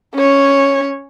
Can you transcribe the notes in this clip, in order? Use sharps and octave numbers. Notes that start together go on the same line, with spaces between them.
C#4 C#5